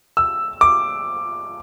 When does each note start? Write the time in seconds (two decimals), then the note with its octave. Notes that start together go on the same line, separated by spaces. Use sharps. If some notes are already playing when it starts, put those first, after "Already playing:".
0.17 E6
0.61 D6